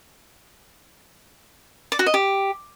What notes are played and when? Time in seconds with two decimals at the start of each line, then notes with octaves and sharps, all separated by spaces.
1.92 D5
1.99 F#4
2.06 D#5
2.14 G4